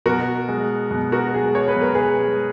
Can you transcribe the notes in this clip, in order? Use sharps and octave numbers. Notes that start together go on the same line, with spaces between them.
B2 F#4 A#4
G#3
B2
F#4 A#4
G#3 G#4
C#5
B4
B2
A#4
G#4 B4
G#3